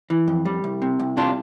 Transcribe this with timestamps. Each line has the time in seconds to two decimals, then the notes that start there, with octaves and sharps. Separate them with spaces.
0.10 E3
0.28 F2
0.45 G3
0.64 C2
0.82 C3
1.00 C2
1.17 C3 D4 F4